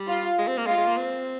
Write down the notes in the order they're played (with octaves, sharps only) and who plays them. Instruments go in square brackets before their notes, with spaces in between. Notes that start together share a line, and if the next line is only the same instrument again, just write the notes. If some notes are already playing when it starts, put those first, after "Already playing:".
Already playing: [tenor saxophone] G3
[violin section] F4
[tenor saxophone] G#3
C4
A#3
[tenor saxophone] G#3 [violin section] F4
[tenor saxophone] G#3
A#3
C4